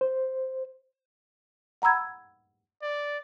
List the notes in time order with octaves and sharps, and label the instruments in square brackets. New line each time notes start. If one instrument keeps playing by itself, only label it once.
[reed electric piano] C5
[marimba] F#5 A#5 B5 E6 G#6
[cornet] D5